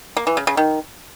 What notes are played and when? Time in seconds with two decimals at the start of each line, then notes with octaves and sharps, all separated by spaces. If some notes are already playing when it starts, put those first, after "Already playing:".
0.17 A#3
0.27 E3
0.37 C#3
0.47 C#3
0.57 D#3